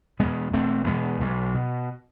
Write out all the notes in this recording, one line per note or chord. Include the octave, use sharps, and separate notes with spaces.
E2 B2 G#3 B3
E1 A3 C4
E2 B2 G#3 B3
B1
B2